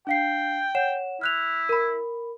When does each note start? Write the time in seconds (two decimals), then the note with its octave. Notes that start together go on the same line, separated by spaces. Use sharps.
0.07 D4 F5 G5 C7
0.75 C#5 F#5 E7
1.21 E4 F6 F#6 F7
1.69 A#4 B5